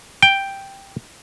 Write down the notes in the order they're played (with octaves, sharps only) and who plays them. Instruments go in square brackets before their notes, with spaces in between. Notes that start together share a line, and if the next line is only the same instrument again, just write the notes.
[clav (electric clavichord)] G5